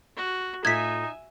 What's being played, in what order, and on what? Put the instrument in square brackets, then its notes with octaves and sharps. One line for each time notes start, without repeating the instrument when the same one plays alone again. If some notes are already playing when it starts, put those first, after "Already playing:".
[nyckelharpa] F#4
[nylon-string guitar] A2 A3 F4 [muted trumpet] D#4 [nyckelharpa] E5 G#5 [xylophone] G#6 B6